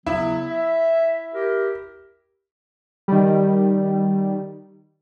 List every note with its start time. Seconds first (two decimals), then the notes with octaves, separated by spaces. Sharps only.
0.07 C#3 F#3 B3 E4
0.50 E5
1.34 G4 A#4
3.08 D#3 G3